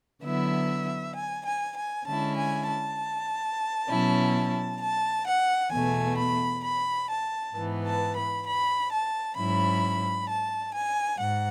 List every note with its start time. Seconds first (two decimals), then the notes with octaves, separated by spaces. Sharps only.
0.23 D3 F#3 B3 E4 E5
1.15 G#5
1.45 G#5
1.76 G#5
2.06 D3 G#3 C#4 E4 A5
2.36 G#5
2.67 A5
3.89 B2 F#3 C#4 E4
4.81 A5
5.26 F#5
5.71 E2 B2 A3 G#5
6.16 B5
6.63 B5
7.09 A5
7.55 G#2 E3 B3
7.85 A5
8.15 B5
8.46 B5
8.91 A5
9.36 G#2 F#3 C#4 E4 B5
10.29 A5
10.74 G#5
11.19 G#2 F#5